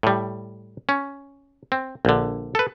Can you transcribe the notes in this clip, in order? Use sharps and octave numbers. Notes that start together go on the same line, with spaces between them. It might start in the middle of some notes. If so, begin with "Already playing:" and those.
A2 G3
C#4
C4
A#1 D3
A4 B4